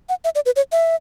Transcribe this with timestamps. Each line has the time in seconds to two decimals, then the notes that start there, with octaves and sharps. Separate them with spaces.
0.09 F#5
0.24 E5
0.35 D5
0.46 B4
0.56 C#5
0.72 E5